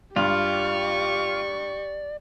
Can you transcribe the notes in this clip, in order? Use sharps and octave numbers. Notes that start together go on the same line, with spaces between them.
G2 F4 G4 D5 C#6